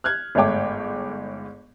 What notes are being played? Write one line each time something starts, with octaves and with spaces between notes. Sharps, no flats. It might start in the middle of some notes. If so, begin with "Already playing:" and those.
F6 F#6 G#6
G1 G#2 A3 C#5 G5 D6